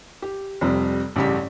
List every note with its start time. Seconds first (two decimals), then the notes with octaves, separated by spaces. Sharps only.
0.22 G4
0.61 F1 F2 G3
1.16 A1 G2 C#3 G4 C#5 B6